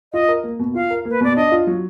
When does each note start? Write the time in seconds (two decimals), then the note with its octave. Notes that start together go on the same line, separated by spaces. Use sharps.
0.13 F4 D#5
0.28 A#4
0.43 A#3
0.59 B2
0.75 F4 F5
0.90 A#4
1.05 A#3 B4
1.21 B2 D5
1.36 D4 D#5
1.52 F4
1.67 F#3